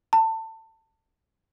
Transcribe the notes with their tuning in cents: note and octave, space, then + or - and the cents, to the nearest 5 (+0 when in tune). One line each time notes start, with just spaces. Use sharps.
A5 +25